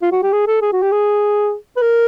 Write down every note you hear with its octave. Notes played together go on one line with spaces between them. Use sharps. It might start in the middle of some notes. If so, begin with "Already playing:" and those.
F4
F#4
G4
G#4
A4
G#4
F#4
G4
G#4
B4
A#4